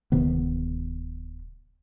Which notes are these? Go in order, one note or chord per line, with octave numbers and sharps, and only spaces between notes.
D1 C3 D#3 B3